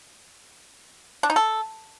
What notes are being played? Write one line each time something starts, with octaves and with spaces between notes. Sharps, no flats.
D4
D#4
A4